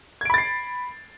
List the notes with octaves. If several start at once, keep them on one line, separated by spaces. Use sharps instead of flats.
B5 G#6 A6 C7 D7